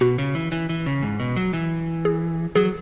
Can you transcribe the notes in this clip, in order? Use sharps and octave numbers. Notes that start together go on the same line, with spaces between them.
B2 F#4
C#3
E3
E3
E3
C#3
G#2
B2
F#3
E3
G#4
F#3 G#4